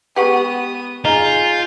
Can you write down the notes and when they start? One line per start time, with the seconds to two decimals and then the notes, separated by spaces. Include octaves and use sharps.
0.16 G#3 B3 G4 B4 F#5 C#6 D#6
1.05 D#4 F4 G#4 G6